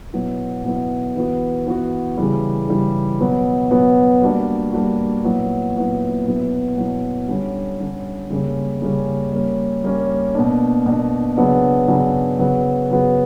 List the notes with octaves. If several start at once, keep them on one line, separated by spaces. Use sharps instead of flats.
B2 F#3 B3 E4
B2 F#3 B3 E4
E3 B3 F#4
E3 B3 F#4
C#3 E3 G3
C#3 E3 G3
B2 F#3 B3
B2 F#3 B3
G3 A#3 D4 F#4
G3 A#3 D4 F#4
A#2 F#3 B3 E4
A#2 F#3 B3 E4
B2 F#3 B3 E4
B2 F#3 B3 E4
D3 G3 C#4
D3 G3 C#4
C#3 G3 A#3 C#4
C#3 G3 A#3 C#4
G3 A#3 C#4
G3 A#3 C#4
B2 A#3 D4
B2 A#3 D4
C#3 F#3 B3 D4
C#3 F#3 B3 D4
C#3 F#3 B3 F#4
C#3 F#3 B3 F#4